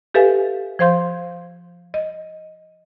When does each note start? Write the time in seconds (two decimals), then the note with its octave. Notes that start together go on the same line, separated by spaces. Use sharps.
0.14 G4 A4 B4 E5 F5 G#5
0.79 F3 C5 F5 C6 G6
1.94 D#5